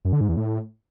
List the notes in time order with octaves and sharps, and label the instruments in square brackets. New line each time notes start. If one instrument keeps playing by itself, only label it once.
[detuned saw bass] F#2
D3
G#2
E2
A2